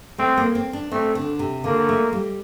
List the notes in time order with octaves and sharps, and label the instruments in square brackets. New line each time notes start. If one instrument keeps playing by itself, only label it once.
[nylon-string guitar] A3 [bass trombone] C4
[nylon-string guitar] A#3
C4
D4
[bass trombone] A3 [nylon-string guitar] C4
[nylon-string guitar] D3
C3
[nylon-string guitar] D3 [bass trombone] A#3
[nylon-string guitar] A3
G3